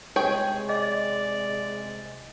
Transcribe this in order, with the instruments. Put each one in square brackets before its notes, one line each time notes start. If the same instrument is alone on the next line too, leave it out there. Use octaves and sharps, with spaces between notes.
[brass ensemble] C3 G#3 [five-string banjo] G#4 C#5 G5
[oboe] D5 [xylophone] D#5